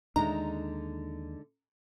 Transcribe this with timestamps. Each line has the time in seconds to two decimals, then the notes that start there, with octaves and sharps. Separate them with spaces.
0.16 D#2 D3 G#3 D4 D#4 A#5